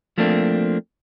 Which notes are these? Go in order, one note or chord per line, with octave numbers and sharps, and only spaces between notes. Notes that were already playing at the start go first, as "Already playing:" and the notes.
F3 A3 A#3 C4 D4